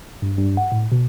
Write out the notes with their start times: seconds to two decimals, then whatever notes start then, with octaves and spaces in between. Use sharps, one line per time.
0.22 G2
0.37 G2
0.57 F#5
0.72 A2
0.92 B2